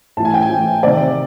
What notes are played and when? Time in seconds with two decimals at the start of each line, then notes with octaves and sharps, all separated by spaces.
0.17 A2 E3 A5
0.25 G#5
0.34 G5
0.42 G#5
0.50 A2 E3
0.83 C3 D#3 D5